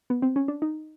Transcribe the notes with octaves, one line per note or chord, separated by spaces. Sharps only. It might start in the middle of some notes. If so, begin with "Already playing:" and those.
B3
C4
C#4
D4
D#4